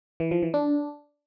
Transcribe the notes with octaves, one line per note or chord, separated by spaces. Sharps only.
E3
F3
E3
D4